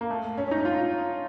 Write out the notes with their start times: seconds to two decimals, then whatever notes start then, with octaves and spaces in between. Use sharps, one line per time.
0.01 A#3
0.10 A3
0.38 C#4
0.48 C#4
0.51 D#4
0.65 F4